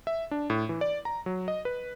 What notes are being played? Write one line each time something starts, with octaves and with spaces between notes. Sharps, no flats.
E5
D4
A2
E3
D5
A#5
F#3
D#5
B4